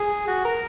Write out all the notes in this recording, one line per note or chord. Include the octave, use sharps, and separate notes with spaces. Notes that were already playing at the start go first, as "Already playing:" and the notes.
Already playing: G#4
F#4
A#4